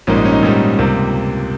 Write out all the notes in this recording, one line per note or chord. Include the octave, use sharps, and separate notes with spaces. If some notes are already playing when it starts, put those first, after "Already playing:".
A#1 G#2 G3 A#3 C#4
D#4
C#4
D#4
A#1 G#2 G3 A#3 C#4
C#2 C3 G3 A#3